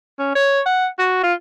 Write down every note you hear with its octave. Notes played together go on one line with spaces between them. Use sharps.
C#4
C#5
F#5
F#4
F4